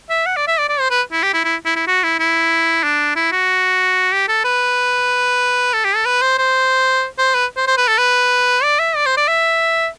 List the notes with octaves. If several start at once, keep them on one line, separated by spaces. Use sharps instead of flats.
E5
F#5
D5
E5
D5
D5
C5
B4
E4
G4
E4
E4
E4
E4
F#4
E4
E4
D4
E4
F#4
G4
A4
B4
A4
G4
A4
B4
C5
C5
C5
B4
C5
C5
B4
A4
B4
D5
E5
D5
C5
D5
E5